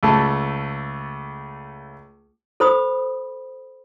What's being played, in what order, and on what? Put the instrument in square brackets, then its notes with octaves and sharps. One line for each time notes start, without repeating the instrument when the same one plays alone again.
[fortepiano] C#2 A3 A5
[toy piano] A4 C5 B5 D#6